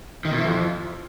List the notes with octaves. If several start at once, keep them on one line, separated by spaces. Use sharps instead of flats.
D#3
B2
E3
F2